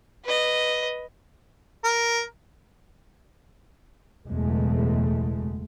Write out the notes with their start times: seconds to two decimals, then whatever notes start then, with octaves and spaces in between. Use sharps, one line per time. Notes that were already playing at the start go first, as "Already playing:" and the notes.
0.24 B4 D#5
1.84 A#4
4.28 F#1 E2 B2 G#3 A3